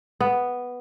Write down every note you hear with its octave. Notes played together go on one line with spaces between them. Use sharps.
B3